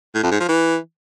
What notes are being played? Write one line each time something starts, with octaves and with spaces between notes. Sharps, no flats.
A2
F2
G#2
F3
E3